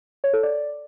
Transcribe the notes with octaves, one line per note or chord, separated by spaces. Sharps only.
C#5
A4
D5